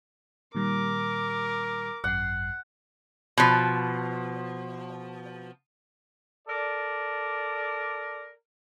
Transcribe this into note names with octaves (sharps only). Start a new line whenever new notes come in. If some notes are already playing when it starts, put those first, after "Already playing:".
A#2 D#3 G3 A#4 D6
G#1 F#2 F#5 C7
B2 F3
A4 A#4 D5